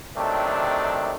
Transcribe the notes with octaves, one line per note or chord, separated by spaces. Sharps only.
C3 D#3 F#3 A3 D4